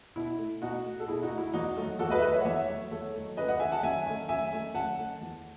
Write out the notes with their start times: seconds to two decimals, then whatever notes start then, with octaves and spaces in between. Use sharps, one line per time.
0.16 B2 E4
0.38 A3
0.62 B2 D#4 F#4
0.85 A3
1.00 A4
1.08 B2 E4 G#4
1.23 D#4 F#4
1.30 A3
1.38 E4
1.53 E2 D#4 F#4
1.77 D#3 F#3 A3
1.99 E2 F#4 A4
2.10 B4 D#5
2.18 E5
2.22 D#3 F#3 A3 B4 D#5
2.33 C#5 E5
2.41 F#5
2.45 E2 C#5 E5
2.68 D#3 F#3 A3
2.91 E2 A4 C#5
3.14 D#3 F#3 A3
3.37 F#2 B4 D#5
3.48 D#5 F#5
3.60 D#3 A3 E5 G#5
3.71 F#5 A5
3.83 F#2 E5 G#5
4.06 D#3 A3
4.29 F#2 E5 G#5
4.53 D#3 A3
4.75 F#2 F#5 A5
4.98 D#3 A3
5.21 E2